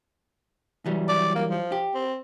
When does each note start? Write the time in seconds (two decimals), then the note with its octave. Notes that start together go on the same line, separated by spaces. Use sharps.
0.86 E3 F#3 G3
1.09 D5
1.35 A#3
1.50 F3
1.72 G4
1.95 C4